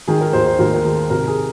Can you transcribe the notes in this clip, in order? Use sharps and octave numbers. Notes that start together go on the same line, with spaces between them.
D#3 G#4
A#4
D#2 C5
C5
D#2 A#4
A#4
D#3 G#4
C3 A#4
G#4